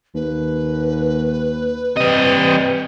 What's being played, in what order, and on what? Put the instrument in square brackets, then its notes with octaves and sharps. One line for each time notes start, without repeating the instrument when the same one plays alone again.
[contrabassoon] D#2 [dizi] B4
[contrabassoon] C3 [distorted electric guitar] G3 D#5